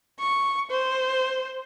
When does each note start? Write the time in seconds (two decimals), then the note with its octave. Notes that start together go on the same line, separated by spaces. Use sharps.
0.19 C#6
0.71 C5